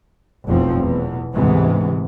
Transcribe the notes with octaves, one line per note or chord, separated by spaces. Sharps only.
F1 B1 E2 B2 F3 C4
E2 B2
D2 G#2 C3 E3 G#3 B3